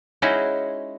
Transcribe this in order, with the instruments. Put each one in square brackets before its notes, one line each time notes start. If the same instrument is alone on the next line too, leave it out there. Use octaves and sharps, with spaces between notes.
[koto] G#3 C#4 D#4 E4 F#4 G#4